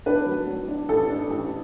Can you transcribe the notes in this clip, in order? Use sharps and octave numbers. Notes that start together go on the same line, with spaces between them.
D4 B4
F#3
F#3
D4
A1 A4
D4
A1